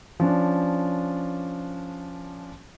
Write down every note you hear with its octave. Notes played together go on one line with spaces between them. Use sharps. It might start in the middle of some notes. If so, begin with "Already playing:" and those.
F3 C#4 D4